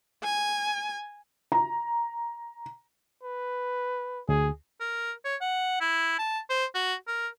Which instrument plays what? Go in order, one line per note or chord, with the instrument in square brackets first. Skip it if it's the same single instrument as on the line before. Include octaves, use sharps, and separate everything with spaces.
[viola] G#5
[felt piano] A#5
[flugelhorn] B4
[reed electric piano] D2 [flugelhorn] G#4
[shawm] A#4
C#5
F#5
E4
A5
C5
F#4
A#4